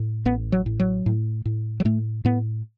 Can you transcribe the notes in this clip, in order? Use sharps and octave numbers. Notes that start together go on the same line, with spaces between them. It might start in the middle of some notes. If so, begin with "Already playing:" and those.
Already playing: A2
A1 B3
F#3
A2
F#3
A2
A2
F#3
A2 A3
A2 B3